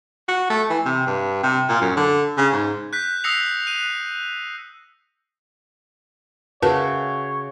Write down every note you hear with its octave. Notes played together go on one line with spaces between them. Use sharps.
F#4
A3
E3
C3
G2
C3
A#2
F#2
D3
C#3
G#2
F#6 G6 B6
D#6 E6 A#6 C7 C#7 F7
F#6 D#7
C#3 F#4 A#4 B4 C#5 E5 A5